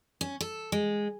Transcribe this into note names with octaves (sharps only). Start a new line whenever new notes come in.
C#4
A4
G#3